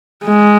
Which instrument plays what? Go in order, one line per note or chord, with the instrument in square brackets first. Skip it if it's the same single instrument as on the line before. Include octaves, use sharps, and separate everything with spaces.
[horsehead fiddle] G#3